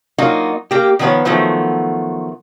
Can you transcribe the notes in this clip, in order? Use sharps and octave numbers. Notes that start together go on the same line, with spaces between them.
F#3 A#3 D#4 F4 F#4
A#3 G4
D#3 F3 B3 G4 B4 C#5
D#3 F3 F#3 A3 B3